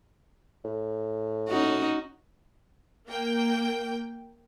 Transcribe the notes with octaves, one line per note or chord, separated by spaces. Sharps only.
A2
C#4 D#4 F#4
A#3 G5